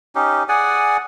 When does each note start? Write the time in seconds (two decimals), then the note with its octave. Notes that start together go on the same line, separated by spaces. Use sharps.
0.15 C#4 D#4 G4
0.49 G#4 D5 F#5 G#5